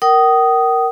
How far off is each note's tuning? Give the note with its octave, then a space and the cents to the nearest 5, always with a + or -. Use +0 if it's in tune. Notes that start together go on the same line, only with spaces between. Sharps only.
A#4 +0 G5 -45 D#6 +0